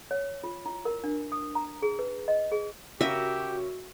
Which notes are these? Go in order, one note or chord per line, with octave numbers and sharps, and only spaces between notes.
C#5
F4
E4
A#4
D4
D#6
A#5
G#4
B4
D#5
G#4
C#3 C#4 F#4 G4 A#4 E5